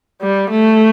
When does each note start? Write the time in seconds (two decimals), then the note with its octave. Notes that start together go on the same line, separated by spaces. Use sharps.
0.22 G3
0.51 A3